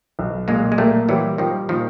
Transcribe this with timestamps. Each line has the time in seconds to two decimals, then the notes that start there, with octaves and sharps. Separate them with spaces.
0.19 B1
0.48 A#2 G#3 A#3
0.72 G#3
0.78 G3 A3 A#3
1.09 E3 F#3 G3
1.38 D#3 F3 G3
1.69 A#2 D#3 F3